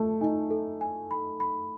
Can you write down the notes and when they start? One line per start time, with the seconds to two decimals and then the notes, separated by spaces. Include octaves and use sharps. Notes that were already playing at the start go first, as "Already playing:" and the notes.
Already playing: A3 A5
0.21 D#4 G#5
0.50 A4
0.81 G#5
1.11 B5
1.40 B5